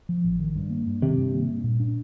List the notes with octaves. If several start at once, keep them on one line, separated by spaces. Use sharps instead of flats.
F3
A1
D#3
G2
A#3
G2
C3 D#3
G2
A#3
G2
A#2
D4